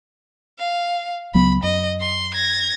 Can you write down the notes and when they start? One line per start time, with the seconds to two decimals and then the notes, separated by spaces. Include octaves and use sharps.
0.58 F5
1.34 C#2 F#3 B3 B5
1.63 F#2 D#5
2.01 C6
2.34 G#6 A#6